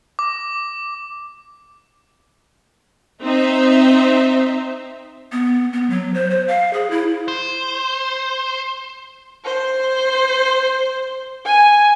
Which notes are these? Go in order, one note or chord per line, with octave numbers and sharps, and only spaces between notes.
D6
C4 D#4 C5 E5
B3
B3
F#3
C5
C5
F5
G#4
E4
C5
C5
G#5